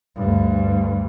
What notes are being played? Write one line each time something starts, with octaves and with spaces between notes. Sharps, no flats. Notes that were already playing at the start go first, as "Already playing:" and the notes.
D2 G2